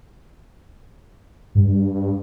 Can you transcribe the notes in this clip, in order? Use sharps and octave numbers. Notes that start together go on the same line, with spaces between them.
G2